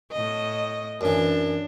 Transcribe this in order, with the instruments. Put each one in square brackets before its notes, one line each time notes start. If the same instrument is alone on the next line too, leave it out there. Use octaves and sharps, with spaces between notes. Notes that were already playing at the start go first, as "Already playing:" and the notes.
[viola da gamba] A2 D#5
[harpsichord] F#2 E3 [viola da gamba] D4